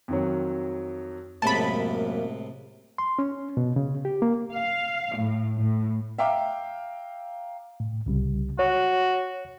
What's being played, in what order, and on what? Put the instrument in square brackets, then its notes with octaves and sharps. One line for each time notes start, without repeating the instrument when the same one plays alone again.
[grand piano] F2 D#3 F#3
[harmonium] F#2 [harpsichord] A2 C3 G#3 [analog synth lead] A#3 [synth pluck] A5 B5
[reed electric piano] C6
C#4
B2
C#3
G4
A#3
[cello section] F5
A2
A2
[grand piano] E5 F5 G5 A#5 D6
[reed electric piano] A2
C2 C#3 G3
[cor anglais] F#4 [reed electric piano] C#5